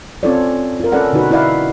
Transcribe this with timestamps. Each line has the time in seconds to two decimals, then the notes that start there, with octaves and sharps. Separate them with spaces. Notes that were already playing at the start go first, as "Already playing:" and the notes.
0.23 C4 C#4 F4 A4 C#5 D5
0.80 F4 A#4
0.92 C#4 A4 B4 D5 F#5
1.13 B2 D3 D#4 F#4 B4
1.31 E4 B4 D5 D#5 F5 F#5